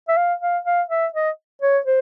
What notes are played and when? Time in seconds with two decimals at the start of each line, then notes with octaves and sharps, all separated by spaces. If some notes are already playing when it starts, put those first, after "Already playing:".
0.08 E5
0.17 F5
0.41 F5
0.65 F5
0.90 E5
1.13 D#5
1.62 C#5
1.86 C5